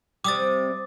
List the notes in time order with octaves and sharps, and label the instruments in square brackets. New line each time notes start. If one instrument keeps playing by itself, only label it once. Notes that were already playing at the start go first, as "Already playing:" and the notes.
[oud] C3 G3 [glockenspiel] D6 D#6 A6